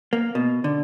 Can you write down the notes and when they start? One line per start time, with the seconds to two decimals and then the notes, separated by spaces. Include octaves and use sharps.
0.13 A#3
0.35 B2
0.64 D3